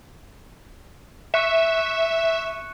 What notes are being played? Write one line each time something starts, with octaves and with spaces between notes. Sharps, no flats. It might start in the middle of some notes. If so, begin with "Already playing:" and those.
E5 C#6 F#6 C#7